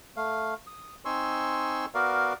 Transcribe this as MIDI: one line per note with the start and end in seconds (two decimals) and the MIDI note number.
0.16 0.54 57
0.16 0.54 77
0.67 0.95 87
1.05 1.86 60
1.05 1.86 63
1.05 1.86 80
1.05 1.86 84
1.05 1.86 85
1.05 1.86 88
1.95 2.33 59
1.95 2.33 66
1.95 2.33 70
1.95 2.33 74
1.95 2.33 77